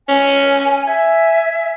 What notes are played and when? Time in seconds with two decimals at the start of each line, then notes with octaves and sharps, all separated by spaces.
0.08 C#4 G#5
0.87 E5 G#5